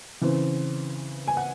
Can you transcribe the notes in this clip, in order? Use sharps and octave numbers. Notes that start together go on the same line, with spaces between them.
C#3 E3 C4
G#5
F#5